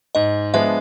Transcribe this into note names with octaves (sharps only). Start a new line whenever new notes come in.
G#2 D#5
F3 G#3 B3 D4 E5